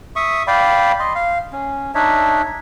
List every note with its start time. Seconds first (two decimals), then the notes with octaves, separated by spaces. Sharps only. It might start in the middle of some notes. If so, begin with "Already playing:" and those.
0.16 E5 C#6 D#6
0.47 D5 F5 G5 B5
0.99 D#5 C6
1.15 F5
1.53 C#4
1.95 D4 D#4 C#5 E5